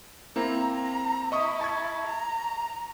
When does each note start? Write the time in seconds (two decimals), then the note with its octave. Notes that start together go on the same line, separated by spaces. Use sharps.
0.36 A#3 C4 E4 A#5
0.73 A#5
1.32 E4 D#5 C#6 D#6
1.61 A5 C#6 G#6
2.07 A#5